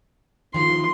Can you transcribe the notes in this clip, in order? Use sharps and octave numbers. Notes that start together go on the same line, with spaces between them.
D#3 F3 C6